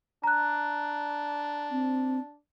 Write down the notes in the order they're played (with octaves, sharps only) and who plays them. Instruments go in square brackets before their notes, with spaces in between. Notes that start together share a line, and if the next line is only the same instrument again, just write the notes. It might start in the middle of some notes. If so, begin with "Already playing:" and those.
[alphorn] D4 [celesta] A#5 F#6
[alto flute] C4